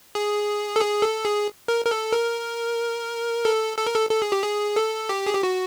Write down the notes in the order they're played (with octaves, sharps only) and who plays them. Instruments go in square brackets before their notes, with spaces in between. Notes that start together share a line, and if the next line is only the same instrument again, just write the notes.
[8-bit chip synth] G#4
A4
G#4
A4
G#4
A#4
A#4
A4
A#4
A4
A4
A#4
A4
A4
G#4
G4
G#4
A4
G4
G#4
G4
F#4